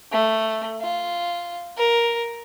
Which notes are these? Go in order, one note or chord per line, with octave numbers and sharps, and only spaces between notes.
A3
F4
A#4